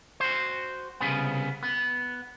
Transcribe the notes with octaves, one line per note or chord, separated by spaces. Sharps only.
F#4 C5
C2 C#3 B3
B3